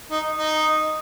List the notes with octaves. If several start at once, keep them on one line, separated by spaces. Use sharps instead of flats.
D#4
D#4